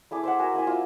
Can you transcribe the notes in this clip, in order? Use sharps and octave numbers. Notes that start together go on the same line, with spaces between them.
A3 E4 G#4 D6
C5 E5 F#5
F#4 A#4 F#5 G#5
A#3 E4 E5 G#5
F4